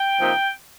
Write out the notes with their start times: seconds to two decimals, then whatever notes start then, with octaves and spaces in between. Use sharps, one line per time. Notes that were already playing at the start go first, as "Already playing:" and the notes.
Already playing: G5
0.20 C3 F3 A#3 D#4